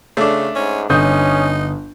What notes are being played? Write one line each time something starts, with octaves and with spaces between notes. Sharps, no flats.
C#3 A3 D4
G#2 C#4
G1 C#4 D#4 D#6 G6